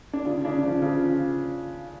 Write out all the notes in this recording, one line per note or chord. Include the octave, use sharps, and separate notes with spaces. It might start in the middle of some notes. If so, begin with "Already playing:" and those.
D4
C#3 F4
C#3 D4
F3 F4
C#3 F4